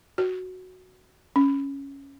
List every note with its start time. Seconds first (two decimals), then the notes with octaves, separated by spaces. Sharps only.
0.18 F#4
1.36 C#4